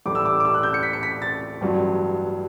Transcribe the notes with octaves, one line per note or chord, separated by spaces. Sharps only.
A1 A2 G3 D6
E6
D6
D6
E6
F#6
G6
C#7
B6
C#7
B6
A6
A1 G2 F#3